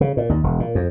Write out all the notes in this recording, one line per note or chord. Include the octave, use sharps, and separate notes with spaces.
C#3
A#2
D#2
E1
A#2
F2